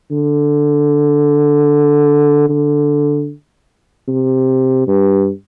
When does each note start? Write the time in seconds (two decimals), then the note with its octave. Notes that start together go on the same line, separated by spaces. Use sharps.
0.11 D3
2.49 D3
4.08 C3
4.87 G2